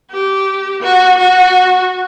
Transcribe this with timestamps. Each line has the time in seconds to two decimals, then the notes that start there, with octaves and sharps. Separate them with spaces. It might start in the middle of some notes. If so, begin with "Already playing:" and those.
0.11 G4
0.82 F#4
1.17 F#4